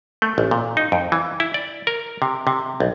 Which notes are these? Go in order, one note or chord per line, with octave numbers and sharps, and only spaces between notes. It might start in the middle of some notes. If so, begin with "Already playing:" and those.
A3
A1
A#2
D#4
F2
E3
E4
D5
A#4
C3
C3
B1